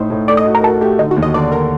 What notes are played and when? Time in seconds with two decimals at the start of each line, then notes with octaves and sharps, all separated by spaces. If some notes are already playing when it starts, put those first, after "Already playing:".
Already playing: A2 A3 D#4 C5
0.10 A2
0.28 A3 D5
0.37 D#5
0.46 F#4
0.55 A#4
0.63 F#4 A4
0.81 A3 G4
0.99 D3 D#4
1.11 F#4
1.16 D#2
1.23 D#5
1.34 D3 D5
1.52 D3 A#4